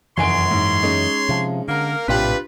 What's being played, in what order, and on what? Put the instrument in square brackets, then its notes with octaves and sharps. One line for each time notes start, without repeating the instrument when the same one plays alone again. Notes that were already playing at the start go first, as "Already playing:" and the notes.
[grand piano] F1 G#5 D7 [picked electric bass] F#2 E3 [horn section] C#5 C6
[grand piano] G#2
G#3 C#4 D#4
[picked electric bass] C3 F3
[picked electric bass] D3 [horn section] A#3 A#4
[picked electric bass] A#1 A2 C3 [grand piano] D4 F4 G4 [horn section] B4